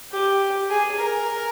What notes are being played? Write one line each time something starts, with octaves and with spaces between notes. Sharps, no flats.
G4
G#4
A#4